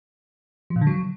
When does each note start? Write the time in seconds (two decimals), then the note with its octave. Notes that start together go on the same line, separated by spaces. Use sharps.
0.70 F3
0.76 A#2
0.81 D3
0.87 F#3